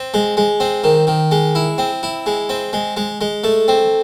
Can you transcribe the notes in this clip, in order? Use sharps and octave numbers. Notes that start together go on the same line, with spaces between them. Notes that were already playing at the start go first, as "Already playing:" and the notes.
Already playing: C4
G#3
G#3
C4
D#3
D#3
G#3
E4
C4
E4
G#3
C4
G#3
G#3
G#3
A3
C4